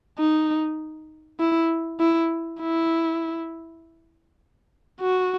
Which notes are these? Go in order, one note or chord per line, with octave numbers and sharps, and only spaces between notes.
D#4
E4
E4
E4
F#4